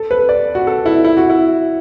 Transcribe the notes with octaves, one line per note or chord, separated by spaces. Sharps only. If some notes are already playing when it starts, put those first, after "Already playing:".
Already playing: A4
B4
D5
F#4
A4
E4
E4
F#4
E4